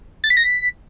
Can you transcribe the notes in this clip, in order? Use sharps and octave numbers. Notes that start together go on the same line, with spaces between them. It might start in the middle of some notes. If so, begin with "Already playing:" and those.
A6
B6
A#6
B6